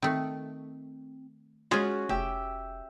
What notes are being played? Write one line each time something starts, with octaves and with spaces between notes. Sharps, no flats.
D#3 A3 C4
G#3 C#4 F4 F#4 G#4
F1 G4 E5 G5 E6